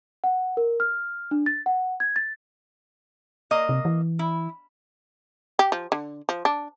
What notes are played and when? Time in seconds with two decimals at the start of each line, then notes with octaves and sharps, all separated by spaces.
0.24 F#5
0.57 A#4
0.80 F6
1.31 D4
1.46 A6
1.66 F#5
2.00 G#6
2.16 A6
3.51 A#3 D#5
3.69 C3
3.85 E3
4.19 E4
5.59 G4
5.72 F3
5.92 D3
6.29 F3
6.45 D4